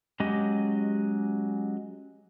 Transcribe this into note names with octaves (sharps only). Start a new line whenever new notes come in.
F#3 G#3 C#4 G4 D#5